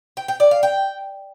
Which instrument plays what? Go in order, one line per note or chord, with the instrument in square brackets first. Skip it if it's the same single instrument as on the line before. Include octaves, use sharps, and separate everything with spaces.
[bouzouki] G5
G5
D5
F5
G5